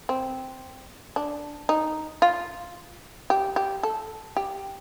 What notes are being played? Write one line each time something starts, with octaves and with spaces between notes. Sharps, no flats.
C4
D4
D#4
F4
G4
G4
A4
G4